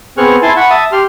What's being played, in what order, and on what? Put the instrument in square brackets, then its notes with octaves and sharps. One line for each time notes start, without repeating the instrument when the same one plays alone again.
[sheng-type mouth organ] B3 C4 G#4 C#6 F6 F#6
E4 G#5 A5 C6
F#5 B5 C#6
E5 A5 D#6
G4 C6 F6